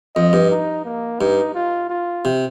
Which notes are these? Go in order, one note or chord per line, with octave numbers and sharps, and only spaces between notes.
F2 D#5
G2
D#4
A#3
G2 D#4
F4
F4
C3